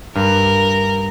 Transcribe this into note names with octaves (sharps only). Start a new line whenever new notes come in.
G2 A#4